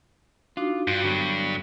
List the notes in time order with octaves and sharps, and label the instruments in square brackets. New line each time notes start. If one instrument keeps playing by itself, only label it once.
[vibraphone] D4 D#4 F#4 [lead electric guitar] F4
[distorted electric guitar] G2 [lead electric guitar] F4 [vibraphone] F#4
[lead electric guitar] D3 F#3 [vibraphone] B3 C#6